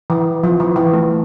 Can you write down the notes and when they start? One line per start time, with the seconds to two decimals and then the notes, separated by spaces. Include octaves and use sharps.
0.10 E3
0.43 F3
0.60 E3
0.76 E3
0.93 A3